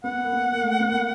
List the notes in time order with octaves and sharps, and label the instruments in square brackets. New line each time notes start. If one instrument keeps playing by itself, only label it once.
[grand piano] B3 [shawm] F#5
[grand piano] A#3
B3
A#3
A3
B3
A#3